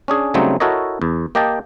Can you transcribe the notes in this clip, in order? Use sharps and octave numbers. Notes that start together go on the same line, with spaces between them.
C#4 D4 G#4
C#3 F#3 G3 A3 C4 D#4
E4 F#4 A4 A#4 C#5 D#5
E2
A#3 G4 D#5 G5 A5